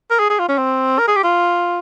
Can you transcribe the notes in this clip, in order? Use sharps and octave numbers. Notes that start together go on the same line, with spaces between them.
A#4
G#4
G#4
F4
C#4
C4
A#4
G#4
G4
F4